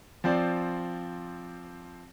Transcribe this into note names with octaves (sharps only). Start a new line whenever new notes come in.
F3 C4 D5